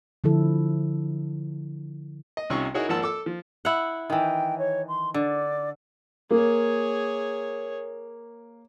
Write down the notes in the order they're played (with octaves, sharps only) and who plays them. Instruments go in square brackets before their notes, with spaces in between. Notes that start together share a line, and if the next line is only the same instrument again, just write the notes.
[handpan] D3 F3 E4 A4
[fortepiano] D#5
C2 C3 C#4 D#4 F4 C#6
D#4 E4 F#4 G#4 A#4 C#5
G#1 F3 A#3 F#5 A5 E6
A4 D6 E6
F3
[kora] E4 F#5
[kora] D#3 E3 [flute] G5
[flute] C#5
C6
[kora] D3 [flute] D5
[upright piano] A#3 [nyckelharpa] G#4 C#5